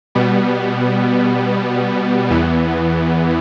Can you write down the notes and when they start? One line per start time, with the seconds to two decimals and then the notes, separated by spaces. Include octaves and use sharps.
0.15 B2 G3 B3
2.30 E2 E3 B3